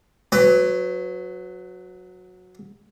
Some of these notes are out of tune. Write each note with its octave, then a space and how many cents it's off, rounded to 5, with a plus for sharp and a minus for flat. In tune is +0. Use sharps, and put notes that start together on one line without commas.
F#3 -15 B4 +20